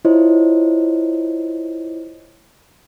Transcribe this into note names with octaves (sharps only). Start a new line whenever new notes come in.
E4 F4 C5 C#5 D#5